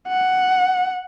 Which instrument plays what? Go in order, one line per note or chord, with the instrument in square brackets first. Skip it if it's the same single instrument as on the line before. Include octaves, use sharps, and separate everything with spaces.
[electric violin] F#5